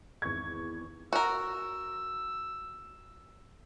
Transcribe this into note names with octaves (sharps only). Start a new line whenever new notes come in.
G#1 E2 E4 C#6 G#6
F#4 A#4 E6